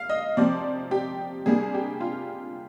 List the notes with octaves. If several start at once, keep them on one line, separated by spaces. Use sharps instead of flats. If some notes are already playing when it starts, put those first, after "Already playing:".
Already playing: F5
D#5
C3 F3 C4 D5
G4
C3 G3 A#3 D4 G#4
G4
F4